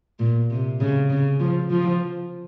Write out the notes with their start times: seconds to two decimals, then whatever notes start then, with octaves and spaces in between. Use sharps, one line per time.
0.19 A#2
0.50 C3
0.81 C#3
1.10 C#3
1.40 F3
1.70 F3